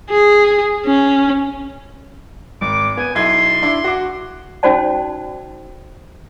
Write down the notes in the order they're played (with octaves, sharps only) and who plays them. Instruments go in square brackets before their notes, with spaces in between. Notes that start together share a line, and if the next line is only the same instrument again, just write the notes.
[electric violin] G#4
C#4
[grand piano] G#1 [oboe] D6
[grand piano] B3 [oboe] G#5
[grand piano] B1 E4 G#6 [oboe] C6
[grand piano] D4 E4
F#4 D6
[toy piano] C#4 D#4 F#4 C5 D5 A5